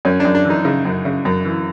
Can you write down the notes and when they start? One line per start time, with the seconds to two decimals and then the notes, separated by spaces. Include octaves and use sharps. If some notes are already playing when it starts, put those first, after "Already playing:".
0.05 F#2 C#4
0.20 D4
0.25 F#2
0.35 D4
0.45 E3
0.50 D#4
0.65 C#3 D#4
0.85 F#2
1.05 C#3
1.25 F#2
1.45 E3